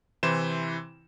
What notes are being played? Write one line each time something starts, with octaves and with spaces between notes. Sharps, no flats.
C3 E3 E4 C5 C6 E7